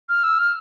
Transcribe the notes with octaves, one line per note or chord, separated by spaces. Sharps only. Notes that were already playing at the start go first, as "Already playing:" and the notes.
F6
E6
F6